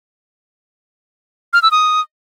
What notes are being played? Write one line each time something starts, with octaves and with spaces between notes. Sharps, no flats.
F6
E6
D#6